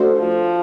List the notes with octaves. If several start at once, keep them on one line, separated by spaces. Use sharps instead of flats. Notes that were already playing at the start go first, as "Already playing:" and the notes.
Already playing: A3 D4 F#4 A4 C5
F3